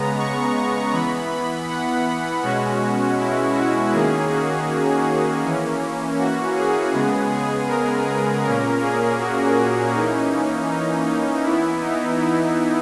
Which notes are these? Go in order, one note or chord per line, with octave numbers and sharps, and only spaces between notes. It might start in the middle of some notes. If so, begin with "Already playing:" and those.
Already playing: C#3 G#3 B3 A#5
C#6
E3 B3 B5
B5
F#5
B2 G#3 C#4 F#4
E4
F#4
D#3 A#3 C#4 G#4
F#4
E3 A#3 C#4
F#4
G#4
C#3 G#3 B3 G#4
G#4
A#4
G#4
A#2 A#3 C#4 A#4
G#4
F#4
F#4
E3 A#3 C#4 D#4
D#4
D#4
E3 B3 E4
D#4
E4